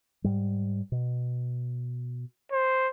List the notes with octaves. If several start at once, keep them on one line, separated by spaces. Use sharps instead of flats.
G#2 G3
B2
C5